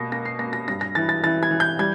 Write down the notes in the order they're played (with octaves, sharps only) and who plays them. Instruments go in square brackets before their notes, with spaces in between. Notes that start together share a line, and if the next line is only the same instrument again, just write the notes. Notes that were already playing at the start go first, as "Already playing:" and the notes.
Already playing: [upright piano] B2 A#3 A#6
A#3 A#6
C7
A#3 A#6
A#6
G2 A#6
A#6
E3 A6
A6
E3 A6
G#6
E3
G6
G3 G#6